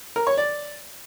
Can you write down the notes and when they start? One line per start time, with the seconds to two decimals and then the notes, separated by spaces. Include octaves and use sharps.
0.16 A#4
0.27 C#5
0.37 D5